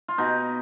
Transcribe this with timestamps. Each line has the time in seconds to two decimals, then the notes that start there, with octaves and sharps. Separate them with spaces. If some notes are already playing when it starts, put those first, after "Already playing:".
0.08 F4
0.18 B2 D#4